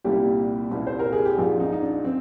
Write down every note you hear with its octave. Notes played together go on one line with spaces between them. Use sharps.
C2 A#2 G3 A#3 G4
C2 A#2 G3 A#3
C5
A#4
G#4
G4
A#1 G#2 F3 G#3 F4
D#4
D#4
D4
F3 C4